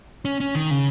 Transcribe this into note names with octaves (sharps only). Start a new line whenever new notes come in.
C#4
C#4
D#3
C#3